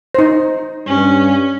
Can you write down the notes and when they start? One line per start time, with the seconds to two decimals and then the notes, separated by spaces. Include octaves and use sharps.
0.15 D#4 C5
0.86 G2 C#4